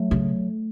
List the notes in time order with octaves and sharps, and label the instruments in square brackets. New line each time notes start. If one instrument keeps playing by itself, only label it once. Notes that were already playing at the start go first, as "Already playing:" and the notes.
Already playing: [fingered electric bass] F#3 A3
[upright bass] C#3